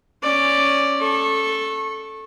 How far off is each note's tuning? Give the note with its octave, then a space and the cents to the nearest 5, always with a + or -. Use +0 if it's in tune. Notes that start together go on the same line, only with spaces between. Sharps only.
C#4 +0 D5 +0
A4 +0 C#6 -25